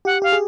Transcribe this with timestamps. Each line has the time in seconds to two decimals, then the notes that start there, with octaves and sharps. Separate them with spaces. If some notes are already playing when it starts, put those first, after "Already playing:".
0.05 G4 F#5
0.22 G4 F5
0.32 G#4